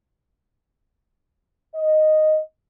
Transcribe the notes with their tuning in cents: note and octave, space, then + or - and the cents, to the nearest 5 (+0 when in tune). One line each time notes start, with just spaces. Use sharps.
D#5 -5